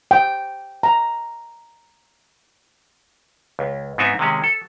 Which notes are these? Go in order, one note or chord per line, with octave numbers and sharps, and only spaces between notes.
G5
A#5
C#2
G#2 B3 C4 D#4 E5
C3 D#3 G#3 C#4
A4